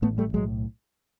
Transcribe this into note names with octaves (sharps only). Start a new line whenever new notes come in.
A1 A2 A3 B3
G3 A3
B1 A2 F#3 G#3